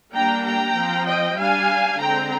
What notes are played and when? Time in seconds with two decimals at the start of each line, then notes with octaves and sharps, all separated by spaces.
0.14 G3 A#3 D4 G5 A#5
0.44 G5 A#5
0.75 F3 C4
1.06 D#5 G5
1.37 G3 D4 F5 G#5
1.99 D3 G#3 C4 G5 A#5